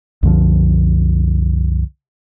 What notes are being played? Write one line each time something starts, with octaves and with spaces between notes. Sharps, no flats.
C2 F#2 D3 F3